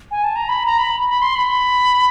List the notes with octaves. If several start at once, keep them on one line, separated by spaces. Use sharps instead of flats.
G#5
A5
A#5
B5
A#5
B5
B5
C6
B5